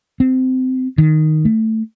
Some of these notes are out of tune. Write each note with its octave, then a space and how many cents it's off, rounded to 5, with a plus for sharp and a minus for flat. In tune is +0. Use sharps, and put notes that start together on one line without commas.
C4 -20
D#3 -5
A3 +10